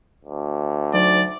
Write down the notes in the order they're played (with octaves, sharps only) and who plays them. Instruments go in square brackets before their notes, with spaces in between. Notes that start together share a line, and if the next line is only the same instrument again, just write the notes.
[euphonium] D2
[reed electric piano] F#3 D#4 C5 [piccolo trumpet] D5